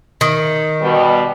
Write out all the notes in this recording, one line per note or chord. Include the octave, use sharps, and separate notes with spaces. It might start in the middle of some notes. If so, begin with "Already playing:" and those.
D#3
B2 G3